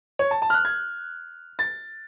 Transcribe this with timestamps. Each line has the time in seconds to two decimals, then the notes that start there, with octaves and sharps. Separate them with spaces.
0.19 C#5
0.31 A5
0.42 A5
0.50 F6
0.54 F#6
0.65 G#6
1.59 A6